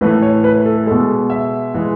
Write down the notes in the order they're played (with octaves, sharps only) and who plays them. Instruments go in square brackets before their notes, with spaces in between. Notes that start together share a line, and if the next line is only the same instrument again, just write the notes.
[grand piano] A2 E3 A3 B4
C#5
B4
A4
B2 G#3 A4
E5
E3 G#3